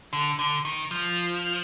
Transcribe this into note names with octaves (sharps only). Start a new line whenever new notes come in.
D3
D3
D#3
F3